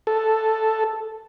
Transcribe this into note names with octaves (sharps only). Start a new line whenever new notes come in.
A4